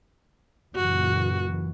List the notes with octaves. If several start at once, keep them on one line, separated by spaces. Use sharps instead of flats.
F#1 A#2 E3 F#4